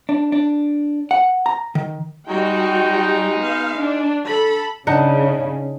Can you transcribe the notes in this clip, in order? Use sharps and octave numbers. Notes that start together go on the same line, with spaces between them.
D4
D4
F#5
A#5
D#3
G3 G#3 D#4 F#4 G5
B3 F5
D4
A4 B5
C#3 D4 D#4 F#5